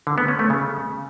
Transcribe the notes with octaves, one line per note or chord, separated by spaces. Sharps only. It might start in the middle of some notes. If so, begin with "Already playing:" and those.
D3
B3
C#4
A3
C#3